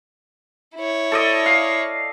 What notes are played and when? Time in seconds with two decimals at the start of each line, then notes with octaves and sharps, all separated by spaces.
0.76 E4 C#5
1.12 A4 D5 D#5
1.46 F5